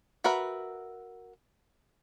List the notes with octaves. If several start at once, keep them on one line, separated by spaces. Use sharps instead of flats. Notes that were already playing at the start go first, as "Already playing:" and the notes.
F#4 A#4 B4 E5